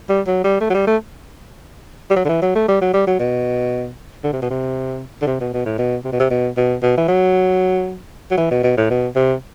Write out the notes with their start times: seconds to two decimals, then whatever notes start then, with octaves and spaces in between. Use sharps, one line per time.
0.09 G3
0.27 F#3
0.44 G3
0.60 A3
0.70 F#3
0.74 G3
0.87 A3
2.10 G3
2.16 F#3
2.25 D3
2.29 E3
2.42 F#3
2.55 A3
2.68 G3
2.81 F#3
2.94 G3
3.07 F#3
3.19 B2
4.24 D3
4.33 C3
4.42 B2
4.50 C3
5.22 D3
5.27 C3
5.40 B2
5.54 B2
5.65 A2
5.78 B2
6.04 C3
6.12 B2
6.19 C3
6.30 B2
6.57 B2
6.82 B2
6.97 E3
7.08 F#3
8.31 F#3
8.37 E3
8.51 B2
8.63 B2
8.77 A2
8.90 B2
9.15 C3